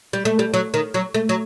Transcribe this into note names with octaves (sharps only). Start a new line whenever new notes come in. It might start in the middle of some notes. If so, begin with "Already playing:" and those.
G3
A3
G3
F#3
D#3
F#3
A3
F#3